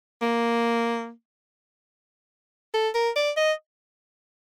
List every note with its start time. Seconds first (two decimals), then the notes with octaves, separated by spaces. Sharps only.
0.22 A#3
2.74 A4
2.95 A#4
3.16 D5
3.37 D#5